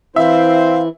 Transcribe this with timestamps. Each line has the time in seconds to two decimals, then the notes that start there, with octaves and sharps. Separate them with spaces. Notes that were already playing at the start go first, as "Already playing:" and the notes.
0.16 E3 C4 E4 C5 E5 F5